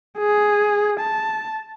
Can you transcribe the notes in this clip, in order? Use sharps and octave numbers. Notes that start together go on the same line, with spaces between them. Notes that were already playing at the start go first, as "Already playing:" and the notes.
G#4
A5